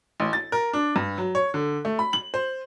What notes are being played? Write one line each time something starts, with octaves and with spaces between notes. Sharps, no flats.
A1
A6
A#4
D4
G2
F#3
C#5
D3
A3
B5
F#7
C5